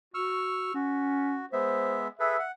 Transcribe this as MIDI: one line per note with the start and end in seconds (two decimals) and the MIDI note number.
0.14 0.71 66
0.14 0.73 85
0.14 0.73 88
0.14 0.73 89
0.74 1.44 61
0.74 1.46 66
1.53 2.08 56
1.53 2.08 59
1.53 1.98 72
1.53 2.08 76
2.20 2.37 68
2.20 2.37 69
2.20 2.37 71
2.20 2.44 76
2.39 2.51 78